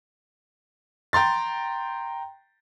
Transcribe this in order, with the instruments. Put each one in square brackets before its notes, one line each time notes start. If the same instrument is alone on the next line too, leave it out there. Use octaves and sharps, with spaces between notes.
[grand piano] G5 A#5 C6 A6